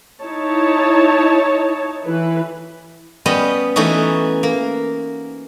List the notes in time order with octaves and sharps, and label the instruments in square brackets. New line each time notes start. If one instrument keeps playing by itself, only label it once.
[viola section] D#4 E4 C#5 A5
E3 B4
[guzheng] G3 B3 C#4 D#5
E3 A3 C#4 D#4 F#4
A#3